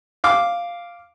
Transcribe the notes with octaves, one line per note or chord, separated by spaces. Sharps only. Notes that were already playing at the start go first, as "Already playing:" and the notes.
F5 D6